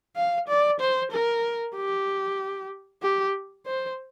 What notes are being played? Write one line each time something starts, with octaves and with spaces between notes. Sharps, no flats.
F5
D5
C5
A#4
G4
G4
C5